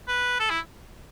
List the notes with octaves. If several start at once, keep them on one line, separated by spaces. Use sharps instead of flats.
B4
A4
E4